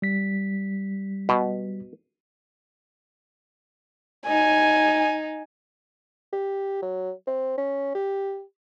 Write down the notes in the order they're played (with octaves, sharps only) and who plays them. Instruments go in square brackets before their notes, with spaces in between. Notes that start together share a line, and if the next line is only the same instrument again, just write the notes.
[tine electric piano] G3 B6
[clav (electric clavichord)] B2
[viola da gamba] D#4 [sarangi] G#5
[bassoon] G4
F#3
C4
C#4
G4